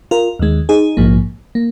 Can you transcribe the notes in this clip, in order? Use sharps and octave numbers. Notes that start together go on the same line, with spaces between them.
F4 A#4
D#2 D#3 G#3
D#4 G#4
A#1 G#2 F3 A#3
A#3